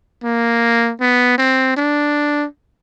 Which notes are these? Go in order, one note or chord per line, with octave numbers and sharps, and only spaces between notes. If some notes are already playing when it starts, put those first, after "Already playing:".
A#3
B3
C4
D4